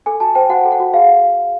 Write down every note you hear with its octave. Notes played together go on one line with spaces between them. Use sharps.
A4 G#5
F#4 A5
C5 G5
F#4 F#5
A4
F#5
F#4
G#4 F5